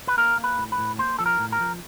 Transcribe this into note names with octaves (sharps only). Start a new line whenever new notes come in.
B4
A#3 A#4
A#3
B4
A2
B4
A2
A#3 C5
F3 A4
A#4
A2
A#4
F3